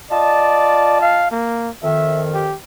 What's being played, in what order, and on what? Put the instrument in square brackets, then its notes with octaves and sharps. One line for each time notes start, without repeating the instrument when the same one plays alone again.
[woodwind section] F4 D#5 A5 [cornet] D5
[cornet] F5
A#3
[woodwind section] F2 D#3 [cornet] E5
[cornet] G4